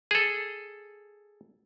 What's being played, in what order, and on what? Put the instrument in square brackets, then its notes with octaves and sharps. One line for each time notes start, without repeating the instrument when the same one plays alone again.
[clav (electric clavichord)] G#4 A4